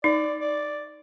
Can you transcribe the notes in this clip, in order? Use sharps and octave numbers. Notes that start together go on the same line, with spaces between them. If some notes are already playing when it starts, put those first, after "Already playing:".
D#4 D5
D5